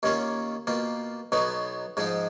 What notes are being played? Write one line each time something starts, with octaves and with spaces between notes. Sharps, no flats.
D#2 D#3 A#3 C#4 F4
B2 A#3 F4
B1 B2 F#3 B3 D#4
G#2 F3 G#3 D#4